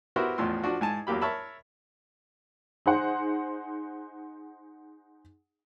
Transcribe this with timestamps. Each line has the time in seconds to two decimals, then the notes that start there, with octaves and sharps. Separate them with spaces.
0.16 B3 E4 F#4 G4 A#4 C5
0.38 A1 E2 A2 F3 C6
0.64 F3 D4 F#4
0.81 G#2 G#5 A5
1.07 E2 F#3 A#3 G4 B5
1.21 A#4 C#5 E5 A5 B5
2.86 D#4 G#4 C5 F#5